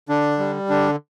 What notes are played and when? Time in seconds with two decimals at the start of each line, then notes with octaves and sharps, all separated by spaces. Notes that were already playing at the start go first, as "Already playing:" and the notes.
0.09 D3 D4
0.39 G3
0.70 D3 D4